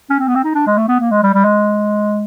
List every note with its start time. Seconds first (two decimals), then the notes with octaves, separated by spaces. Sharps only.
0.10 C#4
0.19 C4
0.28 B3
0.36 C4
0.44 D#4
0.55 D4
0.67 G#3
0.77 A3
0.88 B3
1.00 A#3
1.11 G#3
1.23 G3
1.34 G3
1.45 G#3